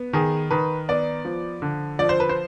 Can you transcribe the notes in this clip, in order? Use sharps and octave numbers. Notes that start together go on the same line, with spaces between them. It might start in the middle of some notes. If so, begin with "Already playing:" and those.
Already playing: B3
D#3 G#4
D#3 B4
B3 D5
F3
D3
F3 D5
C5
B4
C5